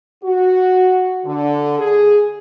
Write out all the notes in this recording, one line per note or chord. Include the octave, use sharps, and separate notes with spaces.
F#4
D3
G#4